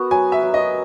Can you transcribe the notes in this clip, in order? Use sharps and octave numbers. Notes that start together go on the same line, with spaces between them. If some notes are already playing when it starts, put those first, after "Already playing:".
Already playing: B3 F#4 A#4
F#3 G#5
E5
F#3
D#5